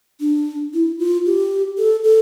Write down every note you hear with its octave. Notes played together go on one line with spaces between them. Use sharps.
D4
E4
F4
G4
A4
A4